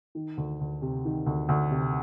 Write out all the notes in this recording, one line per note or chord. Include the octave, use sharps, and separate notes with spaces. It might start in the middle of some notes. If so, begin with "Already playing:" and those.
D#3
D2
D2
C3
D#3
D2
D2
C3